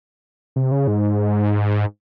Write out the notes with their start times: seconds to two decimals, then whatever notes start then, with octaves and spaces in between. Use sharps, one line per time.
0.56 C3
0.72 C#3
0.87 G#2